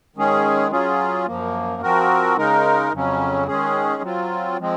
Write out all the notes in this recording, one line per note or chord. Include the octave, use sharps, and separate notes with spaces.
D#3 G#3 C#4 G#4
F#3 C#4 F4 G#4
F#2 F3 A#3
F3 C4 F#4 A#4
C#3 G#3 D#4 A#4
F2 C#3 F#3 C#4
D#3 G#3 C#4 G#4
F#3 C4 F4
F3 G#3 C4